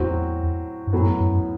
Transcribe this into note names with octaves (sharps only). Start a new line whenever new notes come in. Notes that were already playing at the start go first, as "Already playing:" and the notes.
Already playing: E2 A2 F#3 C4 F#4
G2
F#2 A2 F#3 B3
F#2